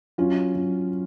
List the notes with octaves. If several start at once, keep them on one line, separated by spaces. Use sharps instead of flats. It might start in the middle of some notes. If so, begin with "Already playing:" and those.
F#3 C#4 F4
F#3